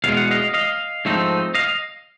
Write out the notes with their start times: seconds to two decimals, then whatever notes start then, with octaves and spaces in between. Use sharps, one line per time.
0.04 E2 B2 G#3 F5
0.17 F#5
0.31 D#5 F5
0.54 D#5 F5
1.05 G#2 F3 A3 C4 D#4
1.55 D#5 F5